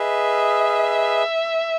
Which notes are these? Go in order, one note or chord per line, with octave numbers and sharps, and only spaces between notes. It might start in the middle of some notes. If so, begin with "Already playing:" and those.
Already playing: G#4 B4 D#5 E5